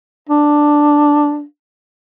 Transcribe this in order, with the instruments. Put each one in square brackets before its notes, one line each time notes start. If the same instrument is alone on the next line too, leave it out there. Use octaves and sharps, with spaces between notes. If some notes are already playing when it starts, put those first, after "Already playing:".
[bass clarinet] D4